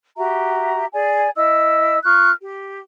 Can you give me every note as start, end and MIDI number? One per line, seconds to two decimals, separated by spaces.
0.17 0.85 66
0.17 0.85 67
0.17 0.85 76
0.17 0.85 82
0.93 1.28 68
0.93 1.28 74
0.93 1.28 80
1.35 1.97 64
1.35 1.97 75
1.35 1.97 88
2.03 2.30 65
2.03 2.30 85
2.03 2.30 89
2.03 2.30 90
2.42 2.80 67